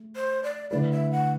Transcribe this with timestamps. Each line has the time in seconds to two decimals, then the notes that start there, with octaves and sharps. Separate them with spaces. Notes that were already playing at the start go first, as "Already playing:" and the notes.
Already playing: A3
0.16 C5
0.44 D5
0.70 D3 A3 E4 B4 D5
0.91 E5
1.12 F#5